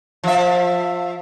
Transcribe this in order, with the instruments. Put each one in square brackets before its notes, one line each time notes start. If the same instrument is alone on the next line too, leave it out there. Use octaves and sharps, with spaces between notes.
[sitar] F3 E5